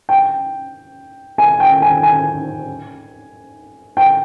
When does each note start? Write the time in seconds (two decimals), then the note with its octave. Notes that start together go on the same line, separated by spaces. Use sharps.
0.09 G5
1.38 G#5
1.60 G5
1.82 G#5
2.03 G#5
3.97 G5